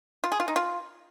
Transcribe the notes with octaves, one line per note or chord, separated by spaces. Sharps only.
F4
G#4
F4
D#4
F4